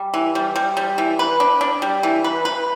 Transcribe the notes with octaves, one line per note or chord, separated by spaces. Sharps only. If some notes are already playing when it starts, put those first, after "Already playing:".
Already playing: G3
E3
G3
G3
G3
E3
B4
D4
D4
G3
E3
B4
B4